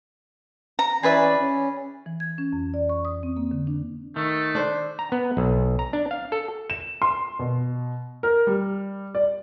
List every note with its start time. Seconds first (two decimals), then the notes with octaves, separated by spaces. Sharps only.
0.79 A#5
1.03 E3 C#4 G#4 B4 D5 E5
1.40 C#4
2.06 E3
2.20 G#6
2.38 C#4
2.53 F2
2.74 D5
2.89 C#6
3.05 D#6
3.23 C4
3.37 A#3
3.51 D3
3.67 D4
4.16 D#3 A3
4.55 D4 C5
4.99 A#5
5.12 B3
5.37 B1
5.79 A#5
5.93 D4
6.11 F5
6.32 A4
6.70 E7
7.02 C6
7.39 B2
8.23 A#4
8.47 G3
9.15 D5